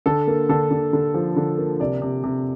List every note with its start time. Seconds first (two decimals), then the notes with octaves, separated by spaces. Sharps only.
0.06 D3 A4
0.28 A#3
0.49 D3 A4
0.71 D3
0.93 D3
1.14 F3
1.37 D3
1.58 A#3
1.80 C3 D5
2.02 C3
2.24 C3